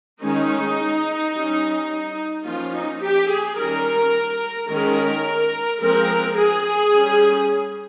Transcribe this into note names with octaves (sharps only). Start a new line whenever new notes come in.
D#3 G#3 C#4 D#4
G3 C#4
F3 A#3 C#4 F4
D#4
G4
G#4
D#3 G3 C#4 A#4
D#3 G#3 C#4 A#4
F3 G#3 C4 A#4
G#4
G3 C#4